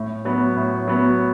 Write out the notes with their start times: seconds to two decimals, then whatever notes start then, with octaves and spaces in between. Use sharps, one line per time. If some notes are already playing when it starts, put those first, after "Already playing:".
Already playing: A2
0.25 F#3 B3
0.57 A2
0.88 F#3 B3